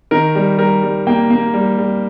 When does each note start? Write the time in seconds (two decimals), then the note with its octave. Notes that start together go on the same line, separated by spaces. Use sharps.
0.11 D#3 A#4
0.35 G3
0.58 G3 A#4
0.83 G3
1.07 A#3 G5
1.30 A#3
1.54 G3
1.78 G3